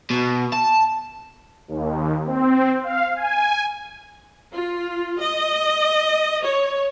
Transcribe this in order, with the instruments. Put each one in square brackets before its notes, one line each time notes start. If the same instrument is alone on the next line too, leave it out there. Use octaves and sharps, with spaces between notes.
[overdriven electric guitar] B2
A5
[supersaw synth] D#2
C4
F5
G#5
[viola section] F4
D#5
C#5